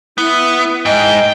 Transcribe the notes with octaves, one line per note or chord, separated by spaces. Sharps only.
B3 E4
G#2 D#5 G5